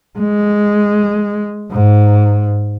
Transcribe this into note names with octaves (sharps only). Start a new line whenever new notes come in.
G#3
G#2